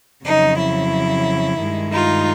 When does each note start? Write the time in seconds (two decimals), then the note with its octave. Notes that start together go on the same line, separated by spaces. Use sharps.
0.24 F2 C#3 F#3 D#4
0.57 E4
1.59 G2 D#3 G#3
1.92 D#4 F4